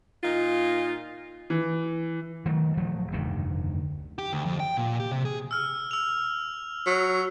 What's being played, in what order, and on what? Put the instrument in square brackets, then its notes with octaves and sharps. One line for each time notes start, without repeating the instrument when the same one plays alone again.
[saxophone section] A#2 D#4 F4
[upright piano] E3
[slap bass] D#3 F#3 A3
D#1 F3 F#3 A3
F1 D2 G2 D#3
[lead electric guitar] G4
D2
F2
G5
A#2
G4
C3
G#4
[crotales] E6 F6
E6 F7
[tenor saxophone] F#3